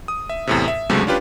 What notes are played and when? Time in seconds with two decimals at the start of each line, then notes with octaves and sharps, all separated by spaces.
0.08 D#6
0.29 E5
0.47 E2 A2 C3
0.68 E5
0.90 C#2 G2 C3 F#3 G#3 A3
1.07 C#4 D4 F4 G4 B4